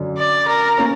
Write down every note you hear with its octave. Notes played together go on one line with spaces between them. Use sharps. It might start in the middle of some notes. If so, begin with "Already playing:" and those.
Already playing: F#2 D3 F#3
D5
A#4
A#3 C#4